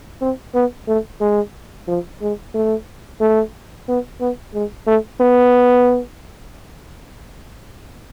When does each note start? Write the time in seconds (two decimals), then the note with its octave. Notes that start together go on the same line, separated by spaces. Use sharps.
0.21 C4
0.55 B3
0.88 A3
1.20 G#3
1.88 F3
2.22 G#3
2.54 A3
3.20 A3
3.88 B3
4.20 B3
4.54 G#3
4.87 A3
5.20 B3